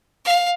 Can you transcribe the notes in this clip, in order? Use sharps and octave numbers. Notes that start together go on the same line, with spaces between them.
F5